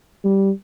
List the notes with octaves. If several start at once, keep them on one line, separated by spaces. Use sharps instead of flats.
G3